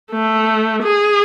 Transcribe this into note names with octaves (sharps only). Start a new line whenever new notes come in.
A3
G#4